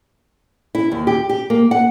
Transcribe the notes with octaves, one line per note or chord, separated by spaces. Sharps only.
E4
D#2
G4
G4
A#3
F#5